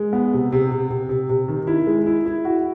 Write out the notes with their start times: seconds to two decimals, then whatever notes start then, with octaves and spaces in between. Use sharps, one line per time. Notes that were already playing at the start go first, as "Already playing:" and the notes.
Already playing: G#3
0.13 B3
0.33 C3
0.52 C3
0.71 C3
0.90 C3
1.09 C3
1.29 C3
1.48 D#3
1.67 E4
1.87 G#3
2.06 E4
2.26 E4
2.45 F#4